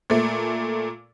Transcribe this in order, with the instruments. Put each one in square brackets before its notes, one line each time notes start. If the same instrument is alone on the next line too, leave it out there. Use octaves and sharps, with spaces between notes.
[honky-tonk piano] A#2 A3